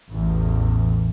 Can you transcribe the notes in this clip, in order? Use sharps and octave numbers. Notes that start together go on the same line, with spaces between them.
A1 E2